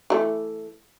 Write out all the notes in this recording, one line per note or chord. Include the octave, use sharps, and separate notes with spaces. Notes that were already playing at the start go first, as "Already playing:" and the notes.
E3 A3